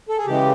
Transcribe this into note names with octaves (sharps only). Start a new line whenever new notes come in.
A4
G#4
C#3 E3 G#3 G4